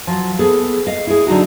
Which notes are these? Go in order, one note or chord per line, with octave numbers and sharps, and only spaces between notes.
F3 F#3
B3 G#4 A4
D#5 F5
E4 G#4
D3 F#3 D#4 F#4